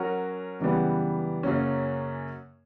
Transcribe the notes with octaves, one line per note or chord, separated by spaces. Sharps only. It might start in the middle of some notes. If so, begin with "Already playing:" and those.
Already playing: F#3 C#4 F#4 A#4
F#2 C#3 E3 G3 B3
F#2 C#3 F#3 A#3 C#4